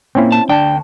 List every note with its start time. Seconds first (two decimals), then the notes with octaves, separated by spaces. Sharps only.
0.15 A#2 A#3 C4 C#4 E4
0.32 A5
0.49 D2 D4 G5 A5